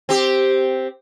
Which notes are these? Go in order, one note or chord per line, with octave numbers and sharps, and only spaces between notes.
C4 G4